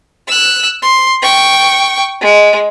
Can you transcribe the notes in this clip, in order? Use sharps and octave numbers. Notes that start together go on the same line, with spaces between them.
E6 F#6
C6
G5 C#6
G#3